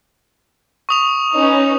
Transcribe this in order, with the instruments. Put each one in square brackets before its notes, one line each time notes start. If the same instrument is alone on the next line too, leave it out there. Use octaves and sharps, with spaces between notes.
[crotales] C#6 D#6 F7
[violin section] C#4 D#4 B4